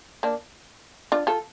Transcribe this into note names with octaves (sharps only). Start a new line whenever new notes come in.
A#3 D4
D4 F4
F4 A4